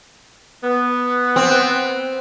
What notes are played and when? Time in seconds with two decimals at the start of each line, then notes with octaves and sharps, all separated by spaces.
0.63 B3
1.36 C4